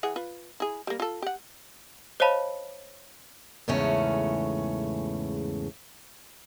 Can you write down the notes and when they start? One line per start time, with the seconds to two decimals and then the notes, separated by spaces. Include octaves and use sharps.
0.03 E3 G#4 F#5
0.16 F4 B4
0.60 E4 G#4
0.87 G3 A#3
1.00 F4 A4
1.22 G4 F#5
2.20 C5 C#5 D#5 F5 A5 B5
3.68 E2 G#2 C#3 A3 C#4